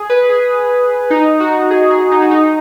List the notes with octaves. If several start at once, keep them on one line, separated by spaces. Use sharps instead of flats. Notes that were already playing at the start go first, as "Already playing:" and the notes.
Already playing: G#4
B4
G#4
D#4
F#4
G#4
G#4
D#4
F#4
D#4